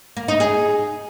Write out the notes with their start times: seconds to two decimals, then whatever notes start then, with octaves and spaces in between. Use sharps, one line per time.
0.17 A#3
0.28 D#4
0.40 G#4